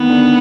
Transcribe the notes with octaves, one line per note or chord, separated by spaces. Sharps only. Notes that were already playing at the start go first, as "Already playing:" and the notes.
Already playing: D#3 B3
D3